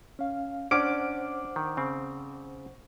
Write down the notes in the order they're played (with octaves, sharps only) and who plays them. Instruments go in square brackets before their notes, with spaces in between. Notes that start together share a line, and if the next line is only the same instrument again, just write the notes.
[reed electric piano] C#4 F5
[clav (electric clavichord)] C#4 [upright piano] D4 D6 D7 [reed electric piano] C5 F#5 F6
[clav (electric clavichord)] D#3
C#3 C4